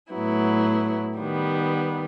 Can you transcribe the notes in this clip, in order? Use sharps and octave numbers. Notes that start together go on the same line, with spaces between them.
A2 F#3 B3 E4
D#3 G3 B3